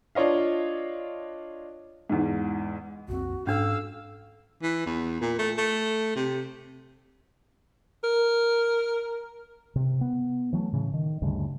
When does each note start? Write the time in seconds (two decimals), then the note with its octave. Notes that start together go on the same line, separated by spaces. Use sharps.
0.15 D4 F4 C#5 D#5 F5
2.10 E2 G#2
3.08 B1 F2 C4 F#4
3.47 G#2 C#4 D4 A4 F5 E6
4.62 E3
4.86 E2
5.21 A#2
5.39 A3
5.57 A3
6.15 C3
8.04 A#4
9.76 C3
10.01 B3
10.53 E3 F#3 G#3 A3
10.72 A2 C#3 E3
10.94 D#3
11.22 D2 G2 C#3